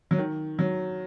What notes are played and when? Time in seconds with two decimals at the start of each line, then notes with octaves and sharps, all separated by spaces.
0.11 F#3
0.18 D#3
0.59 F#3